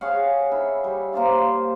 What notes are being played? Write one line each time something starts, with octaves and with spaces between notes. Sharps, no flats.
G#4 C#5 F5 F#5
E4
G3
A#3 C5 D5 F5